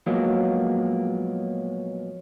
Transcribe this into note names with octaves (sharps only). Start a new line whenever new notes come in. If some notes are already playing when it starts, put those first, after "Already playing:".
A#2 F3 F#3 G#3 A#3 B3